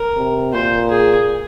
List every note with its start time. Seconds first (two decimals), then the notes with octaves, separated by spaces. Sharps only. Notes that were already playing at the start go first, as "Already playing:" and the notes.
Already playing: A#4
0.16 C3
0.53 A#2 C5
0.89 G#4